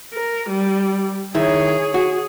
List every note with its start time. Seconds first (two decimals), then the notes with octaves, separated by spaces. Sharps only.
0.14 A#4
0.49 G3
1.35 D#3 E4 G#4 C#5
1.94 F#4 G#4